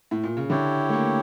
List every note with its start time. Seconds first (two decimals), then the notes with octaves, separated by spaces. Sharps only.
0.11 A2
0.24 A#2
0.37 C#3
0.50 D3 E4 G4 C#5 G5
0.89 A3
0.93 A#3